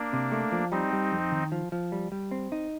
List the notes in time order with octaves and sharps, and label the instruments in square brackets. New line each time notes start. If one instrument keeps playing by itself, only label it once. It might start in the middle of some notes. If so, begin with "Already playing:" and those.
Already playing: [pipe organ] A#3 D4
[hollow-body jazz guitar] C3
A3
F3
[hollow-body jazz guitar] G3 [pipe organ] C4 D#4
[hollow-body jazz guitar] G3
F2
D#3
F3
F3
G3
G3
C4
D#4